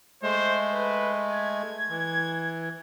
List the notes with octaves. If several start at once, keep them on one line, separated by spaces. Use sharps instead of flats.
G#3 A3 C5
B4
G#6
E3